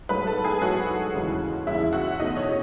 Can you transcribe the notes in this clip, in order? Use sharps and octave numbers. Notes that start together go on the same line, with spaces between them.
G#2 F#3 A3 B4 B5
A4 A5
G#4 G#5
G#2 F#3 A3 F#4 F#5
D#2 C#3 E3 G#3
D#2 C#3 E3 G#3 E4 E5
F#4 F#5
E2 B2 A3 D#4 D#5
C#4 C#5